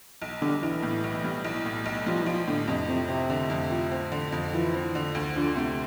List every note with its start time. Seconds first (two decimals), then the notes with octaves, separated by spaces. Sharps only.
0.22 B1
0.41 D3 G3
0.63 B1 E3
0.83 A2
1.04 B1
1.24 G3
1.45 B1
1.65 A2
1.86 B1
2.06 F3 G3
2.21 E3
2.26 B1 F3
2.48 A2 D3
2.68 F2 C3
2.88 C3 F3
3.09 C3 C4
3.30 D3
3.50 F2
3.70 F3
3.92 C4
4.12 D3
4.32 F2
4.53 E3 F3
4.74 C4
4.95 D3
5.15 D2
5.36 D3 F3
5.56 C3 A3